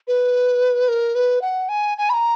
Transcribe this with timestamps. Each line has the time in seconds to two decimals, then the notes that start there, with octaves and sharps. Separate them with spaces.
0.08 B4
0.88 A#4
1.15 B4
1.42 F#5
1.69 G#5
1.98 G#5
2.10 B5
2.14 A#5